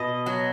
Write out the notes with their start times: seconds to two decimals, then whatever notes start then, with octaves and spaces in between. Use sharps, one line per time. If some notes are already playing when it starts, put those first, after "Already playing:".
Already playing: B2 D#5
0.26 F#3